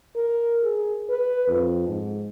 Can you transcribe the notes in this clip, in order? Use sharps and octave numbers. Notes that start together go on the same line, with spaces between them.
A#4
G#4
B4
F2
G#2